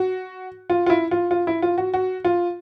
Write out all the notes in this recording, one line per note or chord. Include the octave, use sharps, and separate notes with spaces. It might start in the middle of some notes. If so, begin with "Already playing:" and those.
Already playing: F#4
F4
F4
E4
F4
F4
E4
F4
F#4
F#4
F4